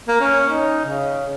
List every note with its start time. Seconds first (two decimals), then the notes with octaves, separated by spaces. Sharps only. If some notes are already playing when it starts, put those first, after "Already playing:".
0.08 A#3
0.21 C#4
0.50 D#4
0.85 C#3